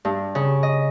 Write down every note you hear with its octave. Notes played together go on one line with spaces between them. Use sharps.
G2
C#3
D#5